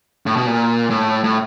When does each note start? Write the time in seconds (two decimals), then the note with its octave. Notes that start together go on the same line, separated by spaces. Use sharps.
0.26 A2
0.37 B2
0.47 A#2
0.90 A2
1.24 A2